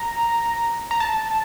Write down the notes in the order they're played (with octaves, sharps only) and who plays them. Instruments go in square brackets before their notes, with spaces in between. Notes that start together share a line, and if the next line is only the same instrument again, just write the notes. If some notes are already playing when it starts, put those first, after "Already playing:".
Already playing: [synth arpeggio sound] A#5
A#5
A5